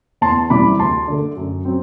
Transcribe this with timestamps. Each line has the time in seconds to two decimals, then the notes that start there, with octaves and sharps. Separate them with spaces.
0.21 E2 A5 C6
0.50 C3 E3 G3 B5 D6
0.79 D2 A5 C6
1.08 D3 A3
1.37 F#2
1.65 F#3 C4